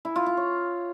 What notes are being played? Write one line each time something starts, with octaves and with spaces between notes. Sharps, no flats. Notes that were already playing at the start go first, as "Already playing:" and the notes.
E4
F4
F4
C#5